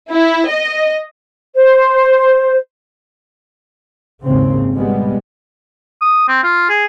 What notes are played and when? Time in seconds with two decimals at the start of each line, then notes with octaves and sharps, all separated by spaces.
0.11 E4
0.49 D#5
1.56 C5
4.25 G#1 D#2 G#2 C#3 C4
4.72 B2 G3 G#3 B3
6.02 D#6
6.28 C4
6.43 F4
6.70 G#4